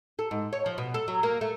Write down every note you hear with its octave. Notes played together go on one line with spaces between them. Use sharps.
A4
G#2
C#5
F3
B2
A4
F#3
A#3
A3